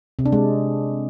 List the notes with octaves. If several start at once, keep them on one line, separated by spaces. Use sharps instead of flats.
C3
D4
G#3